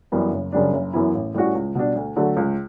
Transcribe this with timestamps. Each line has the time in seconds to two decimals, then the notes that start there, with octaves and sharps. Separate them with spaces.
0.12 F#2 E3 G3 B3
0.32 F#1
0.52 F#2 C#3 G3 D4
0.73 F#1
0.93 F#2 E3 B3 E4
1.15 A1
1.34 A2 G3 C#4 F#4
1.55 C#2
1.75 B2 G3 D4
1.96 D2
2.16 D3 F#3 A3
2.37 C#2